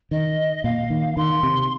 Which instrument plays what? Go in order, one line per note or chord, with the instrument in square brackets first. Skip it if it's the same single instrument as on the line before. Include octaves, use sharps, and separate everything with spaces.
[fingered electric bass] D#3 [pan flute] D#5
[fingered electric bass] A#2 [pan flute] F5
[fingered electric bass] D#3
[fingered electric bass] D#3 [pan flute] C6
[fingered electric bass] C3